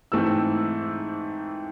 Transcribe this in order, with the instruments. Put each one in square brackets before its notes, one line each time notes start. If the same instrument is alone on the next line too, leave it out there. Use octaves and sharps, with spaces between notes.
[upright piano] G#2 E3 A3 C4 E6